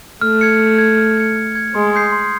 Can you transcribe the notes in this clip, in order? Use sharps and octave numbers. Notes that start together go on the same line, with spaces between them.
A3 F6
G#6 C#7
F6
G#6 C#7
F6
G#6 C#7
F6
G#6 C#7
G#3 C6
D#6 G6 C7
C6